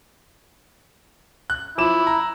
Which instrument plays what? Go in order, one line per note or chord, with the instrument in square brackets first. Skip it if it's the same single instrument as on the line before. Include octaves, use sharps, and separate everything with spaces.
[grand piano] F#6
[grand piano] F3 D6 E7 [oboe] E4
[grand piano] A#5